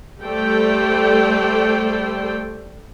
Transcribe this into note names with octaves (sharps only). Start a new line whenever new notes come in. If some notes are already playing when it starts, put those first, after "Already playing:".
G3 A3 A4 C5 D5 G5